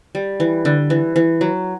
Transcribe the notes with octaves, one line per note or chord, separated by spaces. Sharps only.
G3
E3
D3
E3
E3
F#3